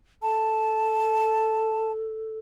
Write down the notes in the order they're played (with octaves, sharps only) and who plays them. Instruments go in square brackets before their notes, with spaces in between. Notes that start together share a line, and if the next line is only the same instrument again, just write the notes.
[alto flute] A4 [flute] A5